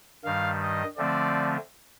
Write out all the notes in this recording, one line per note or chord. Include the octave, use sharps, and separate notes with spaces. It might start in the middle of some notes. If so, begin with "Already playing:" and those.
G2 D#3 G3 F5
D#5
D3 F3 A3 C4 D5